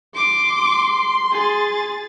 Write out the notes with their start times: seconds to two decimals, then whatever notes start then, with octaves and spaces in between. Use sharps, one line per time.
0.15 C6 D6
1.32 G#4 A6